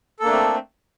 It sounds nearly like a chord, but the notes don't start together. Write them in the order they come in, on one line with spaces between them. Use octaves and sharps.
A4 A#3 D4 A3 C4